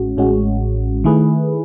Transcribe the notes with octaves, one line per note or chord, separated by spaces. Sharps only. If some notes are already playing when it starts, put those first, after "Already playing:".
Already playing: A1 A2 G#3 C#4 F#4
A1 A2 G#3 C#4 F#4
D#3 A3 E4 G#4 B4